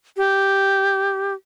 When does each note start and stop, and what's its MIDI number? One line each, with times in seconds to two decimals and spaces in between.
0.17 1.34 67